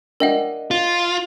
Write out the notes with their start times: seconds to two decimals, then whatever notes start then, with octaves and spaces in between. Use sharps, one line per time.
0.20 D4 A#4 D#5 E5 F#5 G5
0.71 F4